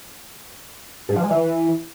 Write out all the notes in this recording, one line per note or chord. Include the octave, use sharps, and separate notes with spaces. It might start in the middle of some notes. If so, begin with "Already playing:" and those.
G#2
F3
G#3
E3